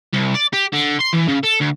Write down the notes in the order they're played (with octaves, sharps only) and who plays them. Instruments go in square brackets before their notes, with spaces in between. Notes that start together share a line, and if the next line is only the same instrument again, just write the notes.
[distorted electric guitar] C2
D5
G4
D3
C6
E3
C#3
A4
D2